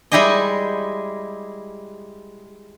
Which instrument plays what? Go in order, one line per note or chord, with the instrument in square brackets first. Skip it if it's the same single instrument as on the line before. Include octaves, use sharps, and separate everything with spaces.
[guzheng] G3 G#3 E4 G4 G#4 D#5